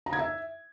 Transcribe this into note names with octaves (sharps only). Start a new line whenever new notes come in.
A#5
G#6
E5